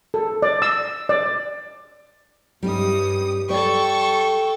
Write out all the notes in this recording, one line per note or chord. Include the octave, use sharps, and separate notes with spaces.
A4
D5
E6
D5
G2 G3 C#4 D#4 D#6
G3 A4 C5 D5 G5 C#6